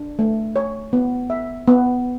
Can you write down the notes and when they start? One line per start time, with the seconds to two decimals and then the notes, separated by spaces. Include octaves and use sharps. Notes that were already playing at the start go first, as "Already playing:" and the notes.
Already playing: D4
0.19 A3
0.56 C#5
0.93 B3
1.30 E5
1.67 B3